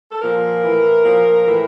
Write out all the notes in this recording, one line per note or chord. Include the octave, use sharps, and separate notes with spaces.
A4
A#2 F3 A#4
A2 E3
A#2 F3
A2 E3